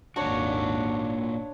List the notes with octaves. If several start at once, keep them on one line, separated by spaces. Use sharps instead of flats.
G#1 D#2 A#2 D4 F#4 C#5